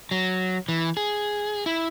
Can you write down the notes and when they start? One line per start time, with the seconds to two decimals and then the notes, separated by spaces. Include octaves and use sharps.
0.11 F#3
0.69 E3
0.97 G#4
1.66 E4